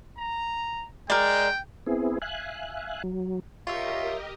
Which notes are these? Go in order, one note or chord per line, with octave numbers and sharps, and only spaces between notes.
A#5
G#3 A#4 D5 G5
B3 C4 E4 G#4
E5 F5 G#5 F#6
F#3
F4 G4 A#4 C#5 D#5 E5